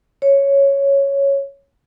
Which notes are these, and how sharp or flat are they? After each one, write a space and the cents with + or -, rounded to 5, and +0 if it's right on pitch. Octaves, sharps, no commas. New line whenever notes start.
C#5 +0